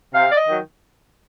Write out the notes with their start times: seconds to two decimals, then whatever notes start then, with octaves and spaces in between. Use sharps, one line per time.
0.14 C3 F5
0.32 D5
0.37 D#5
0.48 D#3 F#3